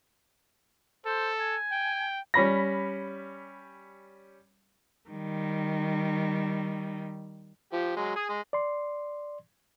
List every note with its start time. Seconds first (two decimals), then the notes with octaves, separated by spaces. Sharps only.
1.06 A4 C5
1.40 G#5
1.72 G5
2.34 G3 C#4 B5 A#6
5.10 D#3 G3
7.73 F3 G4
7.96 F#3 G#3
8.16 G#4 D#6
8.29 G#3
8.53 D5 C6